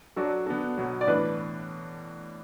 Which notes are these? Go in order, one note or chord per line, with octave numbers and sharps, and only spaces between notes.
F#3 D4 F#4 A4 D5
D3 B3 D4 F#4 A4
B2 F#3 B3
D5
A2 E3 D4 B4